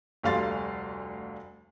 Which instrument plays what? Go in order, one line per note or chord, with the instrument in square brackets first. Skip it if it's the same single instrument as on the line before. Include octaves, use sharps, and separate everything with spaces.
[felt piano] F1 D2 G3 F5 C6 A6